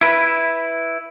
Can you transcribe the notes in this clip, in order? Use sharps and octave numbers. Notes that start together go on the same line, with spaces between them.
E4 B4